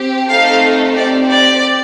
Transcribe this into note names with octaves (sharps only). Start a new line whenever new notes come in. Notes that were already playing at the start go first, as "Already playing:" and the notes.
Already playing: C4 G4
A3 C4 D#4 A4 F5
C4 G4 D5
D5